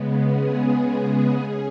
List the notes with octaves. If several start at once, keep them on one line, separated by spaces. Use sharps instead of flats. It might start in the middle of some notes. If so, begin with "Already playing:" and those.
Already playing: C#3 G#3 B3
G#4
C#4